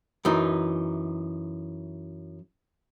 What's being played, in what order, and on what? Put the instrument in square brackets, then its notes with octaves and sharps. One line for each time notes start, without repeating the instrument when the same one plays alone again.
[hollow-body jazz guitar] F#2 E3 D#4